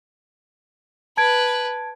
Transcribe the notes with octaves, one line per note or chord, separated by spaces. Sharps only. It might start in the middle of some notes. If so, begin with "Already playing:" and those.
B4 A5 G#6 D7